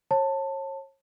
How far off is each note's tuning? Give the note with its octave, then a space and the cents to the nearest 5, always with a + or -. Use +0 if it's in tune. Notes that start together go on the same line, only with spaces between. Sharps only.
C#5 -35 A5 +15